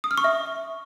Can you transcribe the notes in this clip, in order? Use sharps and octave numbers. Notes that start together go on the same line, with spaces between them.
D#6
F6
C#6
E5